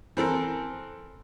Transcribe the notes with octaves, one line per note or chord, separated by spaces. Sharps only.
E3 C4 A4 A#4